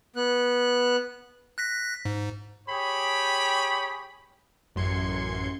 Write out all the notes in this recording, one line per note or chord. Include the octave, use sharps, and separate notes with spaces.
B3 F#6
F#6 A#6 B6
G#2
G4 G#4 C#5 G5 B5
A1 F#2 C6 G#6 C#7